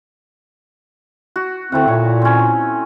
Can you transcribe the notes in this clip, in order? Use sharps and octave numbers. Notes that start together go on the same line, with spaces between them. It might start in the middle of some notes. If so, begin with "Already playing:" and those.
F#4
D2 D3 A3 C4 E4 F#5
A#2 C#5
C4 C#4